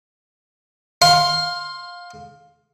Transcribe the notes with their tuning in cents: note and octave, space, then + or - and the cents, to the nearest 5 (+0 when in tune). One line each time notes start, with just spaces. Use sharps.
F5 +15 C6 +10